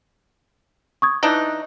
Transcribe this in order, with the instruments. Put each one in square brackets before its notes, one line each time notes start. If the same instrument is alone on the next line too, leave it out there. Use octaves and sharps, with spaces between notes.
[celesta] C#6 D#6 G#6
[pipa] E3 D4 D#4 [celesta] F#6